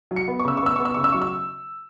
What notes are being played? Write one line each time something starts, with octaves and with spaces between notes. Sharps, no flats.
F#3
C#7
B3
C#6
C#3 E6
C#6
B3 E6
B3 C#6
E6
C#3 C#6
E6
F#3 C#6
E6